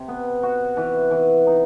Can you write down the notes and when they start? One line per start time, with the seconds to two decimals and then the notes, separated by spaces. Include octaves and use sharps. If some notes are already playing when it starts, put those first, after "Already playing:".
Already playing: C3
0.08 B3
0.43 F#4
0.77 E3
1.11 E3
1.46 D#4